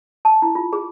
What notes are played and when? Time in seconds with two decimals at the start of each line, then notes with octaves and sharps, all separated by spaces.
0.25 A5
0.42 E4
0.55 F4
0.73 G#4